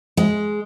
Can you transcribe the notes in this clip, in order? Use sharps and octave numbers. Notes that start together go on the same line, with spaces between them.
G#3